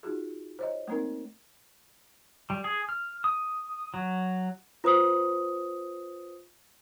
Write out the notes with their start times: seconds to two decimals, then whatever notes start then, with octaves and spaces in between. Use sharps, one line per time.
0.03 D#4 F4 F#4 G#4
0.59 C5 C#5 D#5
0.88 A3 A#3 C4 D#4 A#4
2.50 G3
2.64 G#4
2.89 F6
3.24 D#6
3.94 F#3
4.84 F4 B4 C5 D#6